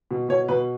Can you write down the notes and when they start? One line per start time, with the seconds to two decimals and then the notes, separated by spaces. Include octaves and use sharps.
0.11 B2
0.29 B2 C#5
0.48 B2 B4